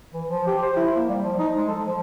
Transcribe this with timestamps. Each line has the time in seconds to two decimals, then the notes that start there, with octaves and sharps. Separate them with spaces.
0.14 E3
0.29 F3
0.47 G4
0.62 C5
0.77 E4
0.96 A#3
1.09 G3
1.23 F3
1.39 D#4
1.57 G#3
1.69 A4
1.84 F3